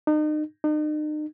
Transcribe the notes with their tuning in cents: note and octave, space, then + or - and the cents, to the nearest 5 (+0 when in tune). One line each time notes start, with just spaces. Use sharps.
D#4 -35
D#4 -40